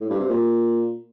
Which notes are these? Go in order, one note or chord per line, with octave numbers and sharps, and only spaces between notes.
A2
G2
C3
A#2